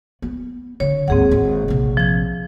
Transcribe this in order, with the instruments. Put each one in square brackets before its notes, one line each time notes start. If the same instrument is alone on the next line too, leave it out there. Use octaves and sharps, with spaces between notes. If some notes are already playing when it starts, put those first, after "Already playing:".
[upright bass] B3
[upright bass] D3 [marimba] C#5
[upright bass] D#2 G#2 [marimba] C4 G#4 F#5
[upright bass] G#1
A#1 C3
[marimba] F3 G#6